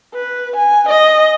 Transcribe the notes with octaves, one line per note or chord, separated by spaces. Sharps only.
B4
G#5
D#5